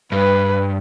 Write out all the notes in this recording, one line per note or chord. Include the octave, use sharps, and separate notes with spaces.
G2 B4